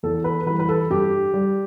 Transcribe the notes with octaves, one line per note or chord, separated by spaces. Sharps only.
E2 A4
B4
E3 G3 B4
B4
A4
G2 G4
G3